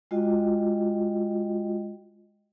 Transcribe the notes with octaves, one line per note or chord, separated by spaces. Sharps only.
G#3 F4 F#4 D#5 G5